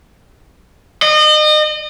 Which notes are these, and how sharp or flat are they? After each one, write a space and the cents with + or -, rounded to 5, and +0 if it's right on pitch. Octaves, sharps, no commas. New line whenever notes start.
D#5 -35